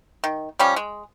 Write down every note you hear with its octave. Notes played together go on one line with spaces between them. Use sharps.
D#3
F3 G3 C#4
G#3